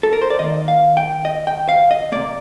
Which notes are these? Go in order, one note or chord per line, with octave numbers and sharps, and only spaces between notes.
A4
A#4
C5
D5
D#3 A#3 D#5
F5
G5
D#5
G5
F5
D#5
C3 D#3 A#3 D5